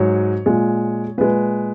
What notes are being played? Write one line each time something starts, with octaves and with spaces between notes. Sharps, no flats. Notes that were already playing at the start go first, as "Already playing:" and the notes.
Already playing: G#2 F#3 C#5
A#2 G#3
A#2 G#3 B4